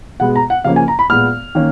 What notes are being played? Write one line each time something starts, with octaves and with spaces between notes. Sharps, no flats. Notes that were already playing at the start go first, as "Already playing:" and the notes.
B2 G#3 B3 F#5
A#5
F#5
C#3 F3 A#3 C#4 F5
G#5
A#5
B5
A#2 G#3 B3 F6
D#3 A#3 C#4